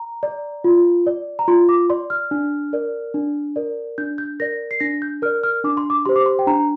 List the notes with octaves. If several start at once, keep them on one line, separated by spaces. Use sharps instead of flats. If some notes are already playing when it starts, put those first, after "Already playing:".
Already playing: A#5
D5
F4
D5
A#5
F4 C6
D6
D5 C6
F6
D4
A#4 D5
D4
A#4 D5
D4 G6
G6
A#4 D5 A#6
C7
D4 A#6
G6
A#4 D5 F6
F6
D4 D6
C6
D6
G4 C5 C6
D6
C6
G5
D4 A#5